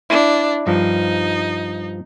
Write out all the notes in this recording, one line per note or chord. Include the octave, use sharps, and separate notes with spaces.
D4 E4
G2 F3 D#4